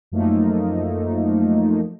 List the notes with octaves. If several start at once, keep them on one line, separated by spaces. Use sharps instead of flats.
F#2 F3 A3 A#3 D#4